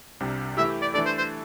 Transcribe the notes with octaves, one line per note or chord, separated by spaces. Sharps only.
C2 C3 G3 D4 G4
E3 A3 E4 G4 E5
D5
E3 A3 D4 A4 D5
C5
C5